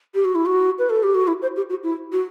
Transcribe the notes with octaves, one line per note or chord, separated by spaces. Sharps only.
G4
F#4
E4
F#4
B4
A4
G4
F#4
E4
C5
G4
F#4
E4
F#4